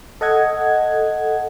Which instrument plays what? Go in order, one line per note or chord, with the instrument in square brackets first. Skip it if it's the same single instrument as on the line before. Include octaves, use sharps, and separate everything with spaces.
[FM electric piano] A4 D#5 F#5 G#6